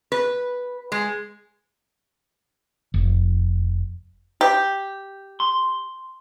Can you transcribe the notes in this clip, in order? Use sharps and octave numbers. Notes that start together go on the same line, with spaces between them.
B4
G#3
F1
G4
C6